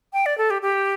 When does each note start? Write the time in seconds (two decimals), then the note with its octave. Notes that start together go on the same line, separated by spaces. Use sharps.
0.13 G5
0.26 D5
0.38 A4
0.50 G4
0.62 G4